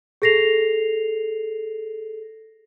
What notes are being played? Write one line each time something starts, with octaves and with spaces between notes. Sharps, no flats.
G#4 A4 A#6 C7 F7